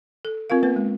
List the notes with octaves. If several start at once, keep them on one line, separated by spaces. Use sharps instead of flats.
A4
C4 F4 A#4 F5
A#3 B3 B4
G#3